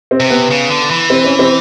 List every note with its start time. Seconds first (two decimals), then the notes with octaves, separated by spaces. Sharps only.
0.11 C4
0.20 C3
0.30 B3
0.51 C#3
0.70 D3
0.91 E3
1.10 C4
1.24 C#4
1.39 C4